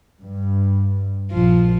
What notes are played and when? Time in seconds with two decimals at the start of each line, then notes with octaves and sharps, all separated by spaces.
0.21 G2
1.31 A#1 F3